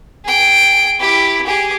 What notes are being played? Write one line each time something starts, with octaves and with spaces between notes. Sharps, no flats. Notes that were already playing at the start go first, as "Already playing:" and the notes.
G#4 G5
E4 G4
G4 G#4